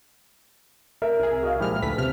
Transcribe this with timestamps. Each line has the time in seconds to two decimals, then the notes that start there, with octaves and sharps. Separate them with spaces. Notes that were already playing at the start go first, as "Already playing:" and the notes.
1.02 A#4 E5
1.19 C2 G#4
1.43 F#4 D#5 F5
1.60 A#2 F3 G#3 E4 G4 F6
1.82 D2 A4 B4 B6
1.98 C3 F6